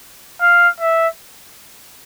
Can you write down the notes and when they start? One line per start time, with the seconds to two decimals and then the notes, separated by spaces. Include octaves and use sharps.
0.41 F5
0.80 E5